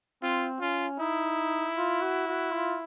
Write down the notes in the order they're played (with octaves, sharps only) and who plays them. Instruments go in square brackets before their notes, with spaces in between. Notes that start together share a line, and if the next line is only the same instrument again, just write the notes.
[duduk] C4 [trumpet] F4
[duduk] C#4 [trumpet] F4
[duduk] D#4 [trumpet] E4
[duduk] F4
F#4
F#4
F4